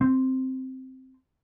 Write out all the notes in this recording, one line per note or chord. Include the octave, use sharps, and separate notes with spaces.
C4